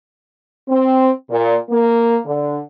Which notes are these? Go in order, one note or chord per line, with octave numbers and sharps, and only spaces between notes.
C4
A#2
A#3
D3